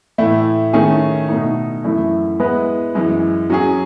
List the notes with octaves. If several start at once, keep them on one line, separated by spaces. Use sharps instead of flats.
A2 E3 A3 E4
D#3 A3 C#4 G#4 C#5
B2 A3 D#4
F#2 E3 A3 E4
G#3 B3 E4 B4
F#2 E3 G#3
F#3 C#4 G#4